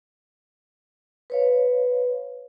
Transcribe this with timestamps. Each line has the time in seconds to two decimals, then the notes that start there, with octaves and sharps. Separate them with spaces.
1.30 B4 C#5 F5